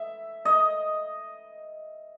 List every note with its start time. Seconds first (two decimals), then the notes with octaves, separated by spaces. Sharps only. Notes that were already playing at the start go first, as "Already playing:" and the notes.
Already playing: E5
0.45 D#5